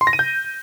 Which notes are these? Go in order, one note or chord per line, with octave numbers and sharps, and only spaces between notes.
C6
A#6
D#7
G6